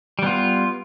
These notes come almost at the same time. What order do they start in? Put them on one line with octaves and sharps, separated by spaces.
G3 B3 F4